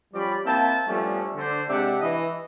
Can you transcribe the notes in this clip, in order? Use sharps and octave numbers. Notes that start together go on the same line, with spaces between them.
F3 G3 C#4 G4 D5 B5
A#3 C4 E4 G5 A5
F3 G3 A3 B3 C#4 D4
D3 D4 C5
C3 G#3 D4 G4 E5 F#5
E3 D#5